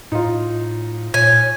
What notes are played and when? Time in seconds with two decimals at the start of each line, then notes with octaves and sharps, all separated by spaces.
0.12 A2 D#4 F4
1.14 A#2 C#5 G#5